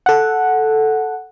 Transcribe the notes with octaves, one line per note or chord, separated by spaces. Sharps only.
A4 F#5